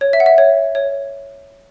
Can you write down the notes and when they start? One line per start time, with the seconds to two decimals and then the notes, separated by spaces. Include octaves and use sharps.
0.01 C#5
0.13 E5
0.20 F#5
0.26 E5
0.38 C#5
0.75 C#5